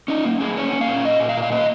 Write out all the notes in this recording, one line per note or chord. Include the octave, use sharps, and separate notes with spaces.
C#4 D#4
A#3
A#3 G#4
C#4 C#5
C#4
F5
A#2
A#2 D#5
A#2
F5
A#2
F5
A#3 D#5